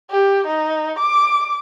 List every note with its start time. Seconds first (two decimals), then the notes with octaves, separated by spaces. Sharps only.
0.11 G4
0.47 D#4
0.99 D6